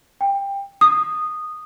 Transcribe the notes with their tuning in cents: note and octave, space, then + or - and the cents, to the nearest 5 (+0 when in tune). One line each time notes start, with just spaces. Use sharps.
G5 +20
D#6 -10